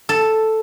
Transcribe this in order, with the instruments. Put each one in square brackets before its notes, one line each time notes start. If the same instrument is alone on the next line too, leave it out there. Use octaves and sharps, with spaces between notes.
[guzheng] A4